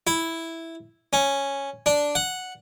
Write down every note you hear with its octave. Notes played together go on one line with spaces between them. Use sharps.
E4
C#4
D4
F#5